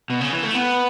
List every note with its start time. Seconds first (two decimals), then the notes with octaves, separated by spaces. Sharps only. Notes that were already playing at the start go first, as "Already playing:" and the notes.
0.10 B2
0.21 C#3
0.32 E3
0.43 A3
0.55 B3